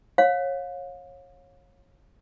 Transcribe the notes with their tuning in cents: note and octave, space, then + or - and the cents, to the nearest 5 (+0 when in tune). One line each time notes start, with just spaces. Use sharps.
C#5 -25 F5 +35